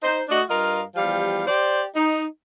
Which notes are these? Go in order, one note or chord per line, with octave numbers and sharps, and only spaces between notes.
D#4 C5
A3 D4 F#4 D#5
G2 F4 A#4 D#5 F5
E2 F3 G3 G4 F5
G4 C5 D5
D#4